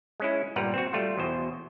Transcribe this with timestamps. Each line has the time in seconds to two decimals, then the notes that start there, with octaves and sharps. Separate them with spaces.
0.20 G#3 C#4 E4
0.56 G1 A#2 G3 B4 F#5 A#5
0.74 C4 F#4
0.93 G3 A3 F4
1.17 E2 B2 C5